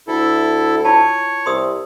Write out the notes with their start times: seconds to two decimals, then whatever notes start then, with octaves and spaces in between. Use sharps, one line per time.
0.08 D2 E4 A4
0.85 E4 F4 C#5 A5
1.46 C2 C6 D#6 E6